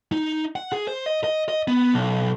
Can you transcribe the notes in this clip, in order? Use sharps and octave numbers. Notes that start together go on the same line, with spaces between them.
D#4
F#5
G#4
C5
D#5
D#5
D#5
B3
B1